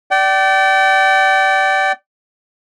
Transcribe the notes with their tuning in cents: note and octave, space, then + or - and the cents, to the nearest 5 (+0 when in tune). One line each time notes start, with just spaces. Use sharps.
D5 +0 G5 -35